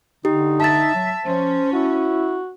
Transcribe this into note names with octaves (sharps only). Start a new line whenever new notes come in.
D3 D#4 G4
E5 A5 A6
F#3
F3 C#4 C5
E4 F#4